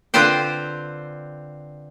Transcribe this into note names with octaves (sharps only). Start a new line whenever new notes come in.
D3 C4 F4 B4 C5 G5